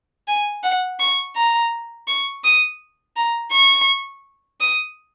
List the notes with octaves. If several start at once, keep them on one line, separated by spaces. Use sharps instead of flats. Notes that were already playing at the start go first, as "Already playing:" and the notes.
G#5
F#5
C#6
A#5
C#6
D#6
A#5
C#6
D#6